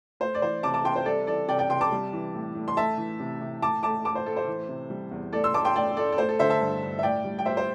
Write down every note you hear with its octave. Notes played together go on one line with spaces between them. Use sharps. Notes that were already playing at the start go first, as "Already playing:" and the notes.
A3 C5
D5
E3 C5
C3 A5 D6
A5 D6
C3 G5 C6
C5
G3 A4 D5
E3 A4 D5
C3 D5 G5
D5 G5
C3 G5 C6
A5 D6
G3
E3
A2
A2
C6
A3 E5 A5
E3
C3
C3
A2 A5 D6
A3 A5 D6
A3 A5 D6
C5
A2 A4
C5
E3
C3
G3
E2
A2 A4 D5
C6 E6
A3 A5 D6
G5 C6
A3 D5 G5
A2 A4 D5
A4
A3 C5
A4
D3 C5 E5
E5 A5
G2
G2
E5
A2 D5 G5
G3
G5
G3 C5 E5
C5